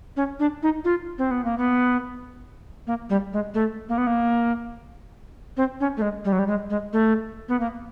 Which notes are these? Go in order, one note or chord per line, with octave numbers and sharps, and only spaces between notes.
C#4
D4
D#4
F4
C4
B3
A#3
B3
A#3
G3
G#3
A3
A#3
B3
A#3
C4
C#4
A3
G#3
G3
F#3
G3
G#3
G#3
A3
B3
A#3